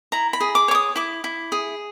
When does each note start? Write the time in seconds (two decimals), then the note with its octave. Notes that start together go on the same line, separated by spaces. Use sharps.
0.12 E4 A#5
0.33 B5
0.41 G#4
0.55 D6
0.68 C#5 D6
0.75 D#6
0.96 E4 D6
1.24 E4
1.52 G#4